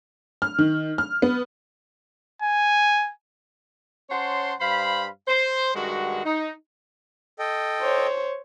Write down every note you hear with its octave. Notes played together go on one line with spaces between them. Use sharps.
F6
D#3
F6
B3
G#5
C#4 C5 C#5 F#5 A5 C6
G2 C5 F5 B5
C5
G2 D#3 G#3 F#4
D#4
A4 D#5 G5
C5 C#5